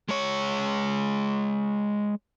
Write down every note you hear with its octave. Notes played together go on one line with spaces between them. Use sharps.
G#3 C#5